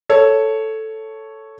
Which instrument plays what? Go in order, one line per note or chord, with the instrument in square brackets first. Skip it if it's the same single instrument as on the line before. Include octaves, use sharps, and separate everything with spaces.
[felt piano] A4 C#5